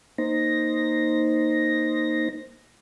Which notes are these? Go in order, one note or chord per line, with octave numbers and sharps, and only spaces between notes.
A#3 D#4 C5 A#6